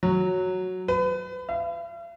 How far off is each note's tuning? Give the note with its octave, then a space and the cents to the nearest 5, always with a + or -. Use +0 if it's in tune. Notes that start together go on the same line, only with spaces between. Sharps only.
F#3 -5
B4 +35
F5 -45